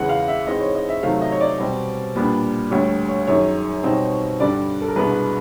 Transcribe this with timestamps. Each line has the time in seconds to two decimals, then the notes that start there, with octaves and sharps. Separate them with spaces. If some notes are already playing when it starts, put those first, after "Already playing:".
Already playing: E2 C#3 E3 G#3 F#5
0.09 F5
0.28 E5
0.47 G#2 E3 G#3 C4 D#5
0.60 C#5
0.75 D#5
0.89 E5
1.03 C3 D#3 F#3 A3 F5
1.22 D#5
1.32 C#5
1.41 D5
1.58 B2 G3 C4
2.15 A#2 G3 B3 D4
2.71 D2 D3 G3 C#5
3.09 C#5
3.27 F#2 D#3 G#3 C#5
3.84 B2 G3 C4 D#4
4.40 G2 D3 G3 D5
4.82 A4
4.88 A#4
4.96 C2 B2 G#3 B3 D4 B4